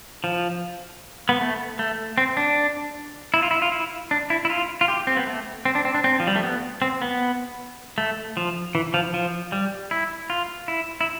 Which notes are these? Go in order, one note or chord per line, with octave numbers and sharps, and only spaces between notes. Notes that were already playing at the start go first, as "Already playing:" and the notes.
F3
B3
A3
A3
C4
D4
E4
F4
E4
F4
E4
D4
E4
E4
F4
F4
G4
C4
B3
A3
C4
D4
C4
D4
C4
F3
G3
A3
B3
C4
B3
A3
F3
E3
F3
F3
G3
E4
F4
E4
E4